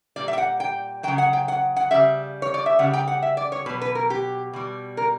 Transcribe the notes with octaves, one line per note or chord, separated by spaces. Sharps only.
A#2 G3 D5
E5
G5
F#5
G5
C#3 F#3 G5
F#5
G5
F#5
F#5
C#3 G3 E5
C#5
D5
E5
C#3 G3 F#5
G5
F#5
E5
D5
C#5
B2 F#3 B4
B4
A#4
G4
B2 G3
A#4